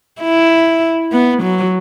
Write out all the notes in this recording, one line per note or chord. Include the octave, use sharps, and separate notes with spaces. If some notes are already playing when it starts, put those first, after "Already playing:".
E4
B3
F#3